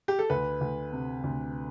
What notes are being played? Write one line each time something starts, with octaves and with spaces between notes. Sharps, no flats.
G4
A4
D2 B4
D2
C3
D2